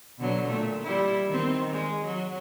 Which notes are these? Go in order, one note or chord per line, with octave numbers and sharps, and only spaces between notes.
B2 D3 F#3
A#2 A3
G3 E4
D#3 C4
G#3
F#3